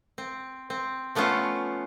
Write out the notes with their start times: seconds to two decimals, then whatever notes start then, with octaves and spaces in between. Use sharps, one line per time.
0.18 C4
0.70 C4
1.15 F3 A3 B3 C#4 F4